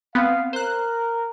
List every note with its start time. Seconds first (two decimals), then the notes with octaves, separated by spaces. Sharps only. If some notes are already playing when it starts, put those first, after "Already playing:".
0.15 B3 C4 F5
0.53 A#4 C5 F#6